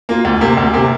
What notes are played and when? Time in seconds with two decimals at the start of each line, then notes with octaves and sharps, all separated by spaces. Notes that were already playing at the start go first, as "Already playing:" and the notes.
0.09 A#3 F4
0.25 D2
0.41 C3 A#3
0.57 D2
0.74 C3 A#3